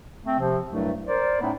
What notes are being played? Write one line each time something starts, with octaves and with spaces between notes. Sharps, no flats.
A3 C4
C3 F3
C2 G2 F#3 A3
A#4 C5 D5
A2 A3 B3 C#4 D#4 E4